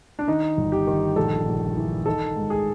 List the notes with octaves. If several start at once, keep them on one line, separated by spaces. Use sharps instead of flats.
D4
D#3 D#4
G1
G4
D#3
A#1 A4
A#1
E3
D#3 A4
G#2
G#4